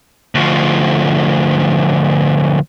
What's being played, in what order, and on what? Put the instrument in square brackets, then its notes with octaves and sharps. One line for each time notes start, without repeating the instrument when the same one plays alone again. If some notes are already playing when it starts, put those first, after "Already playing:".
[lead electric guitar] D2 F3